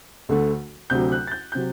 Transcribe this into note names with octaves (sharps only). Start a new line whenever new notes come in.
D2 D3 A3
D2 C3 F#3 G6
F#6
A6
G6
C3 F#3 G6